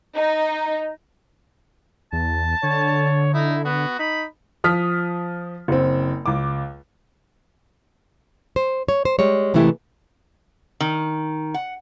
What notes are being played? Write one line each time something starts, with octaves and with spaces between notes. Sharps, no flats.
D#4
E2 A5
D3 C#5
D#4 E4
B3 F#4
D#4 B5
F3 D#6 F6 B6
F#1 C4
C#2 D6
C5
C#5
C5
G3 G#3 C#5
C3 E3 G#3 A3 E4 G4
D#3
F#5